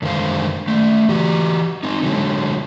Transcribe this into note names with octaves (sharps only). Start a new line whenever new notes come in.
F#2 D3 D#3 G#3 C5 F5
D#3 A3
E3 F#4 G4
C4 D#4
D3 F#3 G#3